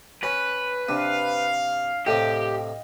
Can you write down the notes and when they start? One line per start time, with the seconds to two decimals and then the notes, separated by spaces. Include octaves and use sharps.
0.23 C#4 B4
0.89 C3 D4 F5
2.07 A2 C3 G4 D#5 F5 G5